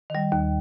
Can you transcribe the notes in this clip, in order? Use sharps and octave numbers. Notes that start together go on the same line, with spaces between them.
D#3 G3
D#2